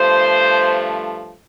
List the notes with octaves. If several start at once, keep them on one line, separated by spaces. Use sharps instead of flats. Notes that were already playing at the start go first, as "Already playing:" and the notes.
Already playing: G2 F3 A3 C5